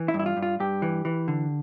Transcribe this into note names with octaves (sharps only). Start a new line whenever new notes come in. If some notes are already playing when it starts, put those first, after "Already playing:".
Already playing: E3
E4
G2
E4
F4
G2
F4
G2 G4
E3
E3
D3